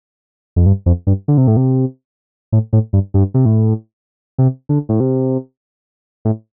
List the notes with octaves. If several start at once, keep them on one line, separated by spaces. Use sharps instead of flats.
F2
G2
F2
G2
D3
C3
A2
C3
A2
A2
G2
G2
C3
A2
C3
D3
A2
C3
A2